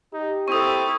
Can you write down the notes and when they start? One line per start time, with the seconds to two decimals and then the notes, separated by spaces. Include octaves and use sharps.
0.14 D#4 G4
0.48 C4 E4 A4 C#6 D#6